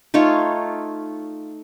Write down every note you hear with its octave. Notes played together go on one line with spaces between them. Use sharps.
A3 D#4 F4 C#5